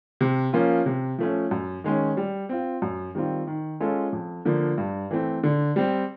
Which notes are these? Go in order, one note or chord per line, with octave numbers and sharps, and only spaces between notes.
C3
F3 A#3 C#4 F4
C3
F3 A3 C#4
F#2
D#3 G#3 C#4
G3
C4 F4
F#2
D#3 G3 C4 F4
D#3
G#3 C#4 F4 A4
F2
D3 F3 A#3
G2
E3 A3 C4
D3
G3 C4